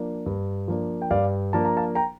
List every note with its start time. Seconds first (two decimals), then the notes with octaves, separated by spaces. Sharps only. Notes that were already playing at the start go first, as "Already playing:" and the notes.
Already playing: F3 A#3 D4
0.26 G2
0.68 F3 A#3 D4
1.02 G5
1.11 G2 D5 F5
1.53 F3 A#3 D4 A5
1.65 A#5
1.77 F5 A5
1.95 G5 A#5